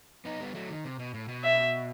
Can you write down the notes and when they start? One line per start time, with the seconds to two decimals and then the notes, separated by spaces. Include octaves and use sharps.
0.25 B3 D#4
0.40 G3 B3
0.55 F#3 A3
0.70 D#3
0.85 C3
0.99 B2
1.14 A2
1.28 B2
1.44 E5